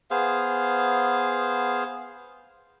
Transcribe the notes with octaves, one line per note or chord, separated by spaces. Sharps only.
B3 G#4 C5 F5